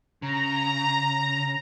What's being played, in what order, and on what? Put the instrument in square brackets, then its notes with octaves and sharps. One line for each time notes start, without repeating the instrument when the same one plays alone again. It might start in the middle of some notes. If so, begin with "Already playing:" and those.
[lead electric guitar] C#3 [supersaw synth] A#5